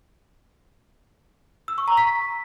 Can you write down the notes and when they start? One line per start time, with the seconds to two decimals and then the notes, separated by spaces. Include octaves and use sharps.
1.68 E6
1.78 C#6
1.88 A#5
1.97 B6